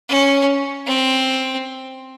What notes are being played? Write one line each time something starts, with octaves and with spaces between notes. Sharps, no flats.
C#4
C4